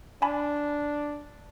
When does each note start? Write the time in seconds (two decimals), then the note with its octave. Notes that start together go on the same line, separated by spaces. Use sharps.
0.22 D4 G#5 A5 B5